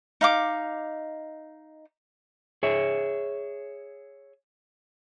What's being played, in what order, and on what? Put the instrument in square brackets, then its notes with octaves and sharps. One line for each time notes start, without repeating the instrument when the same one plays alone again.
[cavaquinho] D#4 F5 D6
[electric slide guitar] G#4 C#5 E5